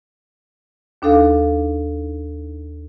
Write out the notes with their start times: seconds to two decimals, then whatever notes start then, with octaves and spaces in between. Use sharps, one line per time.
1.02 D#2 D4 D#4 A4 F5